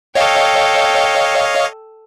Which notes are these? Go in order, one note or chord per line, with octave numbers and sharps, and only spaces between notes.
A4 C#5 D#5 F5 G5